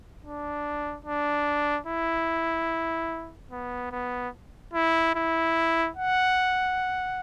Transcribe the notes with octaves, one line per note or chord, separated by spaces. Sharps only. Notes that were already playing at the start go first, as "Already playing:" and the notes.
D4
D4
E4
B3
B3
E4
E4
F#5